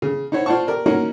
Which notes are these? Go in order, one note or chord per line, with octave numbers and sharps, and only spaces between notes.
C#3
D#4 E4 C5 C#5 F#5
F4 C5 D5 F#5 A5 C#6
G4 A#4 D5
A#3 C#4 D#4 F#4 A#4 F#5